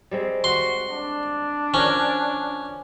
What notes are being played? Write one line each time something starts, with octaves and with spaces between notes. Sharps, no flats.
G3 G#3 C4
F#4 C6
D4
F3 C#4 A#4